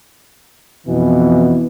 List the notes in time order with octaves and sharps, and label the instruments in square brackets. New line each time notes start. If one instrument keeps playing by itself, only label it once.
[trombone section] F2 B2 E3